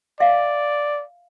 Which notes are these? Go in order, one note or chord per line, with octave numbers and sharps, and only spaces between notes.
D5 E5 F5